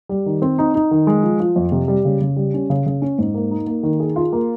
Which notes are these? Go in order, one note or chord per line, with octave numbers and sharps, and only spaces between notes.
G3
D#3
C4
D#4
D#4
D#3
G#3
F3
F3
F2
C3
G3
C#3
C#3
G3
C#4
C#3
C#3
C#4
G#2
A#3
D#4
A#3
D#3
G#4
F4
A#3